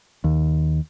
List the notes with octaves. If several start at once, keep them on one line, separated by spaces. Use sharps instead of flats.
D#2